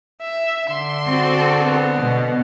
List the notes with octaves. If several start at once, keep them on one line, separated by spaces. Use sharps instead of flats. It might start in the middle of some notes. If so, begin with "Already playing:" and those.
E5
D3 C6
C4 F#4 A4
B3
B2